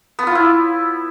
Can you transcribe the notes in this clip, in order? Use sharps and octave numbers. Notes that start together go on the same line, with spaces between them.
B3
F4
E4